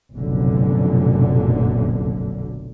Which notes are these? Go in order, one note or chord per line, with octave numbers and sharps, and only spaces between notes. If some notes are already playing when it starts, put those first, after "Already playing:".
F1 B1 F#2 A#2 D3